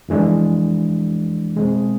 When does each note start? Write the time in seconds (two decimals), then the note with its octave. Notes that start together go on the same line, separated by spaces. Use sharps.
0.09 F2 E3 G#3 D4
1.56 B2 G#3 C4 G#4